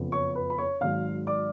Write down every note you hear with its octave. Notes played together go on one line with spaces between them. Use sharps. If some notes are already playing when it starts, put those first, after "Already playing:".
Already playing: F#1 F2 F3 B3
C#5 C#6
B4 B5
B5
C#5 C#6
G#1 G#2 F#3 F5 F6
D5 D6